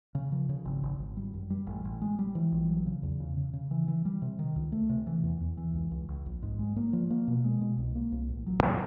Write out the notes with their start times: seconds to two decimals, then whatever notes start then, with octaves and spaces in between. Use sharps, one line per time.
0.15 C#3
0.32 F3
0.49 C#3
0.65 G#1
0.83 G#1
0.99 G#1
1.17 G3
1.34 F#2
1.50 G3
1.67 A1
1.85 A1
2.01 G#3
2.19 G3
2.35 E3
2.52 A#1
2.69 F#3
2.86 C#3
3.03 E2
3.20 C#3
3.37 C#3
3.53 C#3
3.71 E3
3.88 E3
4.05 G3
4.22 C3
4.39 D#3
4.56 C#2
4.72 A3
4.89 C3
5.07 E3
5.23 E2
5.41 E2
5.57 E3
5.74 C#2
5.91 C#2
6.08 C#2
6.26 A#1
6.42 G#2
6.59 G#3
6.76 A#3
6.93 F3
7.10 A#3
7.28 B2
7.44 G#3
7.61 B2
7.78 C2
7.95 A#3
8.12 C2
8.29 A1
8.46 F#3
8.63 A2